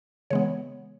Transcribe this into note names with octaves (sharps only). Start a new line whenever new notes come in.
C#3 E3 G#3 B3 C#5